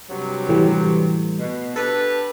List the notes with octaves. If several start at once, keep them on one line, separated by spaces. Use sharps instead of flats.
G2 C3 F#3
A2 E3 G3
B2
D4 G4 A4 B4